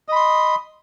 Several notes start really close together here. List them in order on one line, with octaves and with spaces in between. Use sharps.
D#5 B5 C6